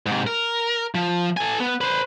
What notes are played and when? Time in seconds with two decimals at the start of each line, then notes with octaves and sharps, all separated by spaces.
0.06 G#2 C3
0.27 A#4
0.95 F3
1.37 A4 G#5
1.60 B3
1.81 B4 C5